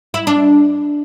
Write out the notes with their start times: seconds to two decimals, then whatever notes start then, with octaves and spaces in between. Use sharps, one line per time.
0.14 E4
0.27 D4